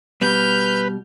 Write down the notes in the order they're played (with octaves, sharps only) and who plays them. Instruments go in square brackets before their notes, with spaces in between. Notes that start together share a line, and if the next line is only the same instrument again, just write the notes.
[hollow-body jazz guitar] B2 G3 [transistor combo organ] B4 [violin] F6 G6